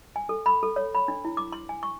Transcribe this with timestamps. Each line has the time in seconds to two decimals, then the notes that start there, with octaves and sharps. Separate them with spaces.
0.16 G#5
0.29 A4
0.46 B5
0.63 A4
0.76 C#5
0.95 B5
1.08 D4
1.25 E4
1.37 D6
1.52 C6
1.69 G#5
1.83 C#6